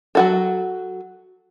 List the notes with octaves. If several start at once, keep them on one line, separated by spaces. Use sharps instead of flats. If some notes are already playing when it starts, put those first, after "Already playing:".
F#3 F#4 A4